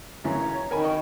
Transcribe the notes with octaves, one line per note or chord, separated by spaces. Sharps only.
F#2 C#3 E3 C#5 A#5
D#3 A#4 G#5 B5
D#4 D#5 G5 C#6